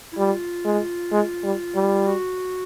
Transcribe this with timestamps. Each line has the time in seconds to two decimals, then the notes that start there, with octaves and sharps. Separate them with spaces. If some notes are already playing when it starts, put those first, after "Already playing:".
0.13 E4
0.17 G3 F4
0.65 G#3
1.12 G#3
1.43 G3
1.75 G3
2.07 F#4